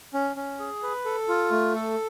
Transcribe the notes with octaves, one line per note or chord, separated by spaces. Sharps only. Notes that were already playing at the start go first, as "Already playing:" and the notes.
C#4
C#4
G#4
B4
A4
F4
A3
A4